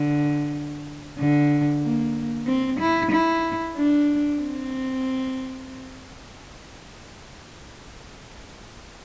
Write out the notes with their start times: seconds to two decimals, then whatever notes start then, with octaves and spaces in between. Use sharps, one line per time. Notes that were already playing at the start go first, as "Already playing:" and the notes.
Already playing: D3
1.18 D3
1.82 A#3
2.46 C4
2.80 E4
3.11 E4
3.76 D4
4.41 C4